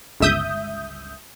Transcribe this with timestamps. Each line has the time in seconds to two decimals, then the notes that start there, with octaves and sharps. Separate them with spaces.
0.20 G1 C#2 E5 D#6 G6